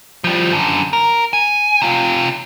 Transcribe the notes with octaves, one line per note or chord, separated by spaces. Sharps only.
F3 G3
F#2 D3
A#4
G#5
C3 F4